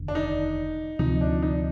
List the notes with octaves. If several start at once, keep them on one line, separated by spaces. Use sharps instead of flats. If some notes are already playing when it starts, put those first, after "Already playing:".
Already playing: F1 D#2 D3
D4
D#4
D2 C3 F3 D#4
D4
D#4